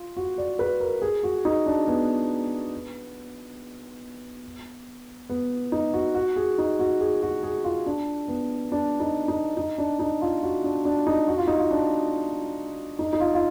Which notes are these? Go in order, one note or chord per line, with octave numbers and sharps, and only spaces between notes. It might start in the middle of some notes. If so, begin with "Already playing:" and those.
Already playing: F4
F#4
D5
B4
A#4
G#4
F#4
D#4
D4
B3
B3
D#4
F#4
F#4
G#4
D#4
F#4
G#4
F#4
G#4
F4
D4
B3
D4
D#4
D#4
D#4
D4
D#4
F4
F#4
D4
D4
D#4
F#4
F4
D#4
F4
D4
D#4
D#4
F4
F4